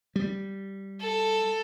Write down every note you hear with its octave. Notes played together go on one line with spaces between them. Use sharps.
G3
A4